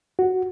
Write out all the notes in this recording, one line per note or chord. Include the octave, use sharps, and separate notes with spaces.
F#4